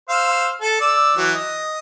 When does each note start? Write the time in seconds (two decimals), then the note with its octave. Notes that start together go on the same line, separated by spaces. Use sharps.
0.09 C5 F5 E6
0.62 A4
0.81 D5 E6
1.17 E3 F#3
1.35 D#5